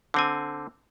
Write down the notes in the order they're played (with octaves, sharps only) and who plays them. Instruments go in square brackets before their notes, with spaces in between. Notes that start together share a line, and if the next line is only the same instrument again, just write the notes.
[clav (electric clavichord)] D3 C4 G#5